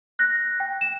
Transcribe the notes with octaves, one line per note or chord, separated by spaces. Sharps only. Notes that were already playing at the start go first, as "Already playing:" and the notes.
F#6 A#6
G5
E7